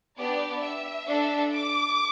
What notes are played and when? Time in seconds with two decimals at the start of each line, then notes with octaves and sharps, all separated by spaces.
0.18 B3 D4 G4 D5
0.62 E5
1.08 D4 A4
1.52 D6